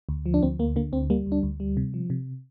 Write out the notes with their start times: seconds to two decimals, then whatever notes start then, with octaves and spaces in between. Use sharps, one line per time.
0.09 D2
0.26 F3
0.34 D4
0.43 D2 C4
0.59 D2 A#3
0.76 D3 A#3
0.92 D2 C4
1.10 G3 A#3
1.26 D2
1.32 D4
1.43 D2
1.60 G3
1.77 C3
1.94 F3
2.10 C3